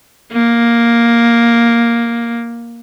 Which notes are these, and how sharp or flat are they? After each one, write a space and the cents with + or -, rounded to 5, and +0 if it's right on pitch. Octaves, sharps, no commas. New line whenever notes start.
A#3 +5